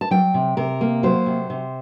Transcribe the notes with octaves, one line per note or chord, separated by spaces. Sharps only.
A5
F#3 G5
C3
C3 A#4
A#3
F#3 C5
C3
C3